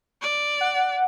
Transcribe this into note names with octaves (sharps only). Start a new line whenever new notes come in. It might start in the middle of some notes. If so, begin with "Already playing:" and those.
D5
F#5